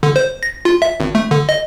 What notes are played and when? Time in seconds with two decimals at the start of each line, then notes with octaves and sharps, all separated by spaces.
0.03 D3
0.16 C5
0.43 A#6
0.65 F4
0.82 E5
1.00 G#1
1.15 A3
1.31 D3
1.49 D#5